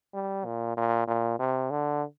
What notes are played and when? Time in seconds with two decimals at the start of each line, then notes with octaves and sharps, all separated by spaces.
0.14 G3
0.45 A#2
0.77 A#2
1.07 A#2
1.39 C3
1.70 D3